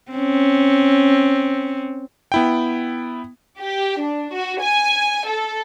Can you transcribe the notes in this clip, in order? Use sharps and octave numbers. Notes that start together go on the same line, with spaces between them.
C4 C#4
B3 E4 G5
G4
D4
F#4
G#5
A4